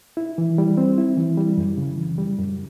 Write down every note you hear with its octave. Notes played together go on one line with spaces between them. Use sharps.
E4
E3
G3
C4
E4
E3
G3
F#2
C#3
E3
G3
F#2